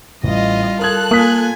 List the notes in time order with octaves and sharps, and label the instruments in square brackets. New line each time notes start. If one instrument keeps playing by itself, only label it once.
[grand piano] A1 [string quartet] G3 F4 [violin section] D#5
[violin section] A4 F#6 [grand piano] A#4 D#6 G#6
[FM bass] A#3 [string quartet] F4 G#5 [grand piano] D#6 B6